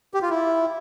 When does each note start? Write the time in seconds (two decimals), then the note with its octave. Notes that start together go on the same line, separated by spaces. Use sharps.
0.14 G4
0.22 F4
0.30 E4